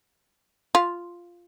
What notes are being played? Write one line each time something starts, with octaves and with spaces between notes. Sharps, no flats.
F4